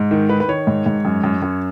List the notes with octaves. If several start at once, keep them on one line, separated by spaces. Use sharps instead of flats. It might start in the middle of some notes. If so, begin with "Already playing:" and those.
Already playing: G#2
D#3
D#3 B4
B4
D#3 C#5
G#2
G#2
F#2
F#2
F#2